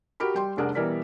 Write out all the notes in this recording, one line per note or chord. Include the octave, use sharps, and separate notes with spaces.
F#4 G4 A#4 B5
G3 G5 C6
F1 C2 D4 G#4 A#4 F#5
B2 E3 G3 A#4 D5 B6